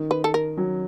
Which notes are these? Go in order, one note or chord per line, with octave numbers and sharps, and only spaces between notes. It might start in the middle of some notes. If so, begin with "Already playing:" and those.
Already playing: D#3
B4
A4
A#4
F#3